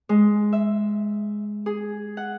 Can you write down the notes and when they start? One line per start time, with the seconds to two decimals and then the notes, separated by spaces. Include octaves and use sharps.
0.09 G#3
0.53 E5
1.66 G#4
2.17 F#5